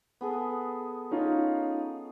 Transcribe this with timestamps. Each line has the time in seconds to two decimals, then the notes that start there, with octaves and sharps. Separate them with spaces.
0.21 B3 G#4 A4
1.11 C#4 D#4 F4